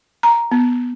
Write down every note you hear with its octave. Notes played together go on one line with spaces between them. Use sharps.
A#5
B3